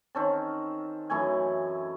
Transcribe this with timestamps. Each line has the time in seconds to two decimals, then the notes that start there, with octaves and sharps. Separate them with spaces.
0.15 D#3 C4 C#4 A5
1.10 F#2 E3 A3 G#5